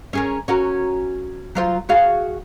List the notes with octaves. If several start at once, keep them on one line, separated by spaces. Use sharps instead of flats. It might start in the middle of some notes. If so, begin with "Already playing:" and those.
C#4 G#4 A#4
C#4 F#4 A#4
F#3 F4 C5
F#4 G#4 F5